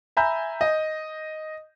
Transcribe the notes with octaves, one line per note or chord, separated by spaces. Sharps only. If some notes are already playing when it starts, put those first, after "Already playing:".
E5 G#5 A#5 B5 G6
D#5